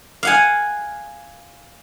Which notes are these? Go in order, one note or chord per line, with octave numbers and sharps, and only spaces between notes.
F5 F#5 G#5